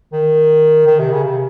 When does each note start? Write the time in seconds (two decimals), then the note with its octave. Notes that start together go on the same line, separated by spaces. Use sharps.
0.13 D#3
0.87 D#3
0.99 C3
1.12 C#3
1.24 C3